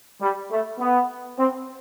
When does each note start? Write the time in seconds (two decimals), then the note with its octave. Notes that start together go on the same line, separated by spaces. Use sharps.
0.21 G3
0.50 A3
0.79 B3
1.38 C4